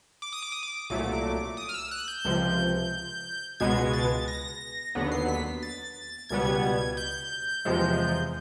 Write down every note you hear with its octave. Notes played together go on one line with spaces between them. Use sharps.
D6
D#6
D6
D#6
D6
C2 A#2 F#3 A3 D6
D#6
F6
E6
F#6
G6
C#2 C3 F3
C#2 B2 G#3 B3 G#6
A6
A#6
D#2 D3 F#3 B3
C7
B6
A6
C#2 B2 G3 B3 G#6
G6
E2 C3 F3 G#3